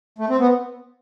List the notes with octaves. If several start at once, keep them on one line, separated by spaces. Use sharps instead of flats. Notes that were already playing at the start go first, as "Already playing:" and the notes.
A3
C4
B3